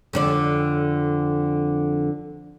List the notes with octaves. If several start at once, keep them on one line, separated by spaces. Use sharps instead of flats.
F2 D3 D5